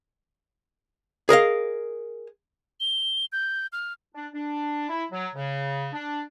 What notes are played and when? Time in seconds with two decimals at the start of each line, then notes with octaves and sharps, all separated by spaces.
1.29 G#4 A#4 D#5 F5
2.80 G7
3.32 G6
3.73 F6
4.15 D4
4.33 D4
4.89 E4
5.12 F#3
5.35 C#3
5.93 D4